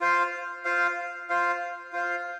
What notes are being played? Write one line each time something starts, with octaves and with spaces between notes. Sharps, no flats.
F4 C5 F5
F4 C5 F5
F4 C5 F5
F4 C5 F5